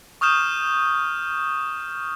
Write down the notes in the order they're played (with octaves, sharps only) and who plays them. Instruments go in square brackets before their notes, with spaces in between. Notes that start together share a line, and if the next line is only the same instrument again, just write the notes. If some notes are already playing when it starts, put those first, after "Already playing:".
[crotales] C#6 D#6 F6 G6 E7